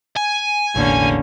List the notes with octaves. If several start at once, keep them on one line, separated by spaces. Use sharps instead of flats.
G#5
E1 A1 D3 A#3 C#4